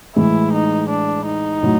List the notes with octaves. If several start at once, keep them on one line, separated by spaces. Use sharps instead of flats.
A2 E3 G#3 E4
D#4
D4
D#4
A2 F#3